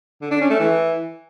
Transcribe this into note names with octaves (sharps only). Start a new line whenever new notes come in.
D3
D4
C#4
A3
E3